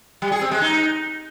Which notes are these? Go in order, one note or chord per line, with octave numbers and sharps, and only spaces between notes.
G3
G#4
C4
G#3
D#4